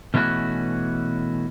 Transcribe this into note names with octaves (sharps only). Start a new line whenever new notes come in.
B2 E3 A3 C#4 F#4